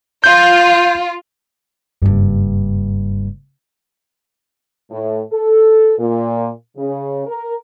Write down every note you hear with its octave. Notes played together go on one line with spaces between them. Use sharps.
F4 G6
F#1 G2
A2
A4
A#2
C#3
A#4